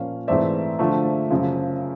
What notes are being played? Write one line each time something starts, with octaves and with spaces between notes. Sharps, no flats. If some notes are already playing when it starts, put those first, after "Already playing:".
Already playing: A#2 F3 A#3 C#4 F5
G#2 E3 A3 C4 D5 E5
D3 F3 A3
F#2 C#3 F3